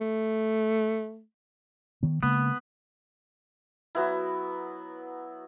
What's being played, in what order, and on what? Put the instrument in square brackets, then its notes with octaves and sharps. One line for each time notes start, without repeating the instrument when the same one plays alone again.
[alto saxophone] A3
[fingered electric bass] D#3 B3
[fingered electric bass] C#3 G#3 A#3 [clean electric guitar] B3
[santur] F#3 B3 E4